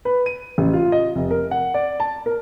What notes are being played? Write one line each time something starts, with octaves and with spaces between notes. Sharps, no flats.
B4
D#7
A1
F4
D#5
F1
A#4
F#5
D5
A5
A#4